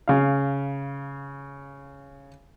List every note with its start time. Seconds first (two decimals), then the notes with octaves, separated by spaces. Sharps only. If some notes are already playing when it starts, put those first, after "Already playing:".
0.08 C#3 F5